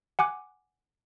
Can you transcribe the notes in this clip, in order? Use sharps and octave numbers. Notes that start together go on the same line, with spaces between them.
F#5 G#5 D6 F#6